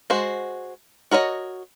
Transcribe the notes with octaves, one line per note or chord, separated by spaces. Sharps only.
G#3 F#4 C5
F#4 A#4 C#5 D#5